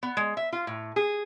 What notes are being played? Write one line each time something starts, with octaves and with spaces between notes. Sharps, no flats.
B3
G#3
E5
F4
A2
G#4